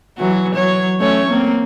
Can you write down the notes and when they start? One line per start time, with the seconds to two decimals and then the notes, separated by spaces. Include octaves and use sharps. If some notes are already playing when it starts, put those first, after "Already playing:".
0.18 E3 F#3 F#4
0.55 F#3 C#5
1.00 A3 C#4 C#5
1.30 A#3 C4